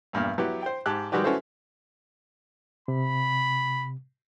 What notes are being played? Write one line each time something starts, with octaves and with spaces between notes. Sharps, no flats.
E2 G2 A#2 F6
F#3 B3 E4 G4
C5 G5
G#2 G4 A5 F#6
D#3 G3 G#3 F#4 G4 B4
C#4 E4 F#4 A4 B4 C5
C3 B5